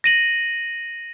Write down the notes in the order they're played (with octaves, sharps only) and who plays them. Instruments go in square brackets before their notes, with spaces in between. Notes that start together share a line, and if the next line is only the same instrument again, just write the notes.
[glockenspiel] A#6 D#7 F#7